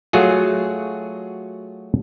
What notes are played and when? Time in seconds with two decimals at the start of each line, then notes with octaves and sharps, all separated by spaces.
0.13 F#3 A3 F4 F#4 G#4